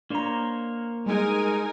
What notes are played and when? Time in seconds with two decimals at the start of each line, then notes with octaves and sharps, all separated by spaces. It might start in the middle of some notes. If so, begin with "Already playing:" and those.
0.10 A#3 D4 C5 C#5 A#5
1.06 G3 G#3 D#4 A#4 G#5